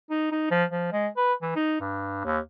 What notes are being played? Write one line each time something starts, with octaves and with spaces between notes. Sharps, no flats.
D#4
D#4
F3
F3
G#3
B4
E3
D#4
G2
D#2